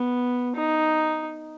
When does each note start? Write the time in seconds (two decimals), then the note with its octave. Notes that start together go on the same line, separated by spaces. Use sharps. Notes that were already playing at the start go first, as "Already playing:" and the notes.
Already playing: B3
0.56 D#4